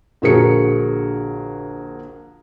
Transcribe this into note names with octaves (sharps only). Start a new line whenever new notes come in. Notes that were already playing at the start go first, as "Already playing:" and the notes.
A#1 D3 F#4 G#4 A#4 C#7